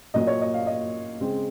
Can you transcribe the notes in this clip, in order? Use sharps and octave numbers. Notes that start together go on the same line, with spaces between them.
A#2 F#3 A#3 D#5
C#5
D#5
F5
D#5
C#3 G#3 C4